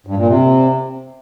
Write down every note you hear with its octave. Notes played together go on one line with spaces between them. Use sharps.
G2
A#2
C3